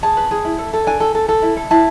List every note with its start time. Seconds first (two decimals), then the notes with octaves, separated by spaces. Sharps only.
0.03 G#4 A5
0.17 B4
0.31 G#4
0.45 E4
0.58 A4
0.73 A4
0.87 D4 G#5
1.00 A4
1.15 A4
1.29 A4
1.42 E4
1.57 A4
1.71 E4 A5